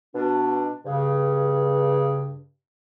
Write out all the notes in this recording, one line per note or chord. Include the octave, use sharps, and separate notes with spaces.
B2 D4
G2 C#3